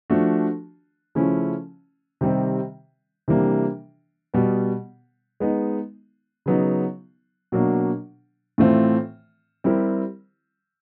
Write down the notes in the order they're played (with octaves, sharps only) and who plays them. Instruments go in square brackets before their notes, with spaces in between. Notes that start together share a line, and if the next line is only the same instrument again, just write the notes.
[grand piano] F3 A3 D4 F#4
C#3 F3 A3 C#4 E4
C3 D#3 G3 C4
C3 E3 G3 A#3 D4
B2 G3 B3
G#3 B3 D#4
C#3 F#3 B3 D#4
B2 F#3 A#3 D4
A2 E3 A3 C4 F4
G3 C4 E4 G4 A#4